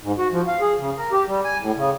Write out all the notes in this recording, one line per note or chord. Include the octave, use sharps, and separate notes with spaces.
G#2
F#4
F3
F5
G#4
C#3
A#4
G4
G3
G#5
A2
C#3